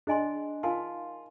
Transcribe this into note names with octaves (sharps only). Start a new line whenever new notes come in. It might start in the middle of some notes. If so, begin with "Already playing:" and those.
D4 G#4 D#5 G#5 C6
D#4 F4 A#4 F5 G#5 C6